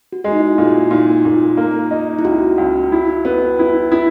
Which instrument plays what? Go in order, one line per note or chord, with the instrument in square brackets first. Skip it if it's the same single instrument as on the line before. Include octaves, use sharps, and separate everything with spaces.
[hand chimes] F#4
[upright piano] G#3 [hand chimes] G#4
[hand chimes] D#4
E4
F#4
[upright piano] A#2
[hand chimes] E4
[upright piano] A#2 [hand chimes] D#4
[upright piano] A#2
A#3
D#4
[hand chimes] E4
[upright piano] C#2 [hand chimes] F#4
[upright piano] C#2
E4
B3
E4
E4